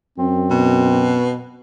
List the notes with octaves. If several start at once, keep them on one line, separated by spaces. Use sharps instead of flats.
F#2 C4
B2